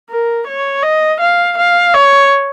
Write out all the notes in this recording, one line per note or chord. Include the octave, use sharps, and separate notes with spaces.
A#4
C#5
D#5
F5
F5
C#5